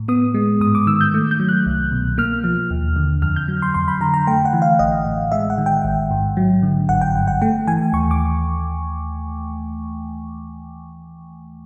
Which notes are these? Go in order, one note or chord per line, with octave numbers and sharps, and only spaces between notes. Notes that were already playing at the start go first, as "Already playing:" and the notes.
Already playing: A2
B3 D#6
G#3
G#2 D#6
D6
D#3 E6
G6
A3
G6
F#3
F#6
C2
B2
A#3 F6
F3
D#2
D3
F2 F6
G6
F#3
C6
F2 C6
B5
D3 A#5
A#5
A3 G5
F#5
E3
F5
A1 D#5
A2
G#3 E5
F#5
D#3
G5
A1
G#2
F#3
D3
G1 F#5
G5
G2
F#5
A3 G5
E3 G#5
D#2 C#6
D6